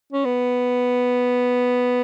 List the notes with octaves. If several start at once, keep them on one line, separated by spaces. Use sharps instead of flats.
C#4
B3